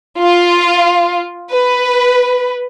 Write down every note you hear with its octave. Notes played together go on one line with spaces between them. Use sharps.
F4
B4